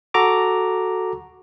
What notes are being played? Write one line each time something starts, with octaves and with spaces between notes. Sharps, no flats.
F#4 A4 A#5 D6